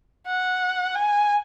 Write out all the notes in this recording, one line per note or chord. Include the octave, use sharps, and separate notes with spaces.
F#5
G#5